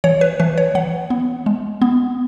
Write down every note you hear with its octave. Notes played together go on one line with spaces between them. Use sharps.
E3 C#5
B4
E3 B4
C#5
E3 F#5
B3
G#3
B3